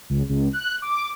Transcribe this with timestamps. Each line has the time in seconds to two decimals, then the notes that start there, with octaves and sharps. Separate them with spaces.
0.10 C#2
0.29 C#2
0.53 F#6
0.82 D6